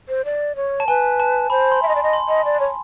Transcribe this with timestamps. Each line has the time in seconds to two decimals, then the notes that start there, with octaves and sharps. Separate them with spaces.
0.09 C5
0.25 D5
0.56 C#5
0.80 A5
0.87 B4 G#5
1.20 A5
1.50 C5 B5
1.72 C6
1.82 E5
1.88 D#5
1.92 C6
1.95 D5
2.03 D#5
2.13 C6
2.28 D#5
2.45 D5
2.60 C#5